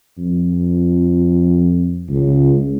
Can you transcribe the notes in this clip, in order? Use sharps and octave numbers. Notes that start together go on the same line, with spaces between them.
F2
C#2